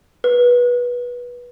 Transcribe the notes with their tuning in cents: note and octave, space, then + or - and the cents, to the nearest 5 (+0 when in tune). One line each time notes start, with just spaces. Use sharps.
B4 -20